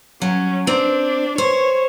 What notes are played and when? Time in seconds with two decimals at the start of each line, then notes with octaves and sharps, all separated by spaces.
0.22 F#3 C#4
0.67 C4 D4
1.38 C5 C#5